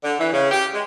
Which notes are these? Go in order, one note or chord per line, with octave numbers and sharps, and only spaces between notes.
D3
E3
C#3
G4
G#3